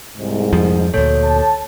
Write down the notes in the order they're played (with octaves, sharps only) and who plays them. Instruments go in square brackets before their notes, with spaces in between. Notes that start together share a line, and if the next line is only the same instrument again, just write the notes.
[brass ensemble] C2 G#2
[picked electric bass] F2 F3
[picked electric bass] D2 A#2 [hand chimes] A4 C#5 G6
[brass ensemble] A5